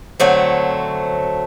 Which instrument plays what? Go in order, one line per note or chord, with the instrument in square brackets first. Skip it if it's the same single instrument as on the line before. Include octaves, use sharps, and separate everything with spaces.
[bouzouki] D3 F#3 A3 C4